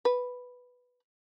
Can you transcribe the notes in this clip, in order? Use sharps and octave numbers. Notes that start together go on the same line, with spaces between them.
B4